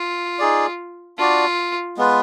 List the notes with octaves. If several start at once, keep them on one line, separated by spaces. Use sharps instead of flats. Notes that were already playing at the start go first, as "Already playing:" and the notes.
Already playing: F4
D#4 G#4 D5
D4 F4 F#4 D5
G#3 B3 F4 B4